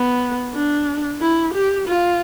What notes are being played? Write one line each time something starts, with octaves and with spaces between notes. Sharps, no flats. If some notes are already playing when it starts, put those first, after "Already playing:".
Already playing: B3
D4
E4
G4
F4